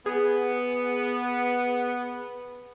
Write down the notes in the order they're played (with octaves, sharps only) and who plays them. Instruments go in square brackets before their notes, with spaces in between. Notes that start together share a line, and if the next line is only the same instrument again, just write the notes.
[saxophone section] B3 [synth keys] G#4